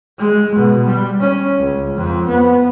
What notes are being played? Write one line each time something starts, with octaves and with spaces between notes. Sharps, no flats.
G#3
B2
G3
C#4
C#2
F2
B3